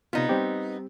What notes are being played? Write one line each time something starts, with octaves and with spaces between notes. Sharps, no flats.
C3 B3 D#4 F4
G3 C4 G4